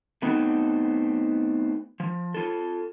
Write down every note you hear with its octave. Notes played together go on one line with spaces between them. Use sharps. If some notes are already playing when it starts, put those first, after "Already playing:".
A3 B3 C4 D#4 F#4
F3
F4 A4